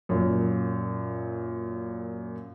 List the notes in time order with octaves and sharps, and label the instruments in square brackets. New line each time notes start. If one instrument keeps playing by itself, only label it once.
[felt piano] F#2 A#2